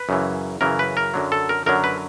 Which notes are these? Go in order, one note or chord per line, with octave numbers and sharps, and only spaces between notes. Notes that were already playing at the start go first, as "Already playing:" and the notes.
Already playing: B4
F#2 C#3 E3
F#2 C#3 E3 A#4
B4
A#4
F#2 D3 F#3
A4
A#4
F#2 D3 F#3 A#4
B4